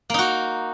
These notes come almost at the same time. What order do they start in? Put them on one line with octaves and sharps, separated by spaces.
A#3 D#4 F#4